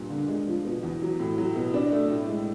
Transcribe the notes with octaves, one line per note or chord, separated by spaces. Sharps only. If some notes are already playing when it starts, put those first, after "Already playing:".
Already playing: G2 A#2
D3
G#3
F3
B2
E2
F#3
A2
F#3
B2
D4
A3
A2
G#3